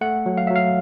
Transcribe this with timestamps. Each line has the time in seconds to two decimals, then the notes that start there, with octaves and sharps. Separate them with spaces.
0.01 A3 F#5
0.26 F#3
0.38 F5
0.47 F#3 E5
0.56 F5